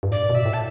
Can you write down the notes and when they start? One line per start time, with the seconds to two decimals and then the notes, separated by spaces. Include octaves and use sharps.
0.03 G2
0.11 A2 D5
0.29 B2
0.35 E5
0.46 A2
0.53 A5